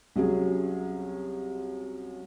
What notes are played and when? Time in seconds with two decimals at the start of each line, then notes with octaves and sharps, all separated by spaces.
0.16 C2 F#3 C#4 G#4